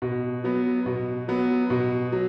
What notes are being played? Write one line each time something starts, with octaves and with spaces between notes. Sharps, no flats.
B2
F#3 B3
B2
F#3 B3
B2
F#3